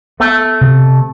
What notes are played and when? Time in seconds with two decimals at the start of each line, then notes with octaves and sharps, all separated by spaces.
0.20 A3 B3
0.61 C3